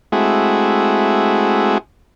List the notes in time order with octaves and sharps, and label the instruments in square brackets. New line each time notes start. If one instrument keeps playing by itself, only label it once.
[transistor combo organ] G#3 A3 C4 E4 F#4 G#4